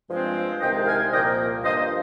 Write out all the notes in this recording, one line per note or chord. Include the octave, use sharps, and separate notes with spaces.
G2 F3 G#3 C4
C2 C3 D#3 G#3 D#5 G5
F5 G#5
C2 A#2 F3 A#3 D#5 G5
G2 F3 A#3 C5 D#5